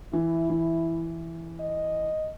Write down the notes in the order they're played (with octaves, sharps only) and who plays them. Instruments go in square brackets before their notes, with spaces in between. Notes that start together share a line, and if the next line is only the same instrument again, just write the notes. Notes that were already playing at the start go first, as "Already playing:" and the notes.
[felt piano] E3 [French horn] E4
[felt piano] E3
[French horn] D#5